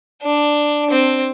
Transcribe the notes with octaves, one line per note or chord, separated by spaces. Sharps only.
D4
C4